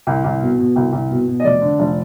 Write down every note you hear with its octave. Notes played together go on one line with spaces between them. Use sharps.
C2
C2
B2
B2
C2
C2
B2
B2
D#5
F1 D5
D3
F1